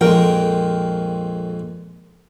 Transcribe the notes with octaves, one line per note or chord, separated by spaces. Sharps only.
A#1 F2 G#3 A#4 G5